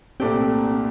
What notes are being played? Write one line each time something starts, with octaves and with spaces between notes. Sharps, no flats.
C2 A#2 A3 C4 D4 G4